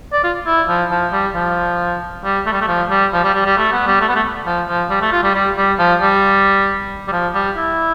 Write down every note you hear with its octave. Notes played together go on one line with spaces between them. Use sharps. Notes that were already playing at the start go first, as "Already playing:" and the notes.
D5
F4
E4
F3
F3
G3
F3
G3
A3
G3
A3
F3
G3
F3
G3
G3
G3
A3
B3
G3
A3
B3
A3
F3
F3
G3
A3
F4
G3
G3
G3
F3
G3
G3
F3
G3
E4